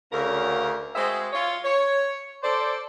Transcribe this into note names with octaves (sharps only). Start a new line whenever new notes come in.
D2 C#3 A#4
G#3 C4 F#4 G#4 C5 E5
F4 C#5
C#5
A4 C5 D5